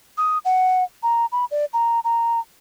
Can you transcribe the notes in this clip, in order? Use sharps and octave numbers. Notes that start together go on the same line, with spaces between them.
D#6
F#5
A#5
B5
D5
A#5
A#5